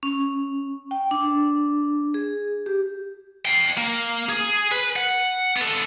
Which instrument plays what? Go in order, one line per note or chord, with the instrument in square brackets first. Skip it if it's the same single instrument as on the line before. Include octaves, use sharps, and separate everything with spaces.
[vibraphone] C#4
G5
D4
G#4
G4
[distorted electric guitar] F5 G5
A#3
G#4
B4
F#5
B3 A4